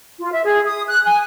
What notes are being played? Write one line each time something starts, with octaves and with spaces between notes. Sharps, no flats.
F4
E5
G#4
D#6
F#6
G#5